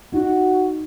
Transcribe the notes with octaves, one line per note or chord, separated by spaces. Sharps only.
D#4 F#4